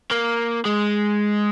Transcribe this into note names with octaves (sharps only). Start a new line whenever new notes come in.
A#3
G#3